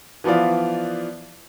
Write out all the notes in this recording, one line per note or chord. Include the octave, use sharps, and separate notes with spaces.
E3 F3 B3 D5 F5